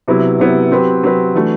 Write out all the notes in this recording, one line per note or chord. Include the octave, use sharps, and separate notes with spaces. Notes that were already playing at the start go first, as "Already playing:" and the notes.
C3 F#3 B3 E4
C3 F#3 B3 E4
F#3 C4 G4 B4
F#3 C4 G4 B4
E3 A3 D4 F#4